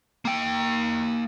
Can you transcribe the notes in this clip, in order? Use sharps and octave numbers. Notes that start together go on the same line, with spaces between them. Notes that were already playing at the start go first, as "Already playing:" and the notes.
A#3 G5